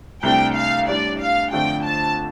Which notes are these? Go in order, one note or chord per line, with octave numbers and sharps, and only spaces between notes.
C2 C3 A3 D4 G5
F5
A2 G3 D4 D5
F5
F2 D3 A3 D4 F4 G5
A5